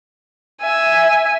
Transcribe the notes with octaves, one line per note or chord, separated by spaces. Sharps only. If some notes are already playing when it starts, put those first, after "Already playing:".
E5 G#5